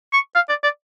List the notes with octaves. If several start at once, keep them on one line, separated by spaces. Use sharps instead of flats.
C#6
F5
D5
D5